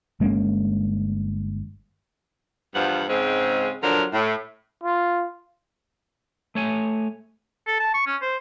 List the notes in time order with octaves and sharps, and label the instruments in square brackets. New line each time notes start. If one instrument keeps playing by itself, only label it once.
[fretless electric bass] G1 G#3 A#3 C#4
[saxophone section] E2 G2 F3 F#5
G#2 C#3 G#3 C4
D3 F3 F#3 D4 A#4
A2
[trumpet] F4
[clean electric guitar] A3 C#5 G#5
[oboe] A4
A5
C#6
C#4
C5